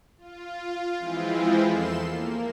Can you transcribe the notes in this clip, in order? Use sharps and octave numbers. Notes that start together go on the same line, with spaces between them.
F4
E3 F3 G#3 C4 E4 F4
E2 A4 C6 E7
A#3